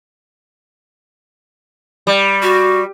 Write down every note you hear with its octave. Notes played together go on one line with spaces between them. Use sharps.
G3
F#4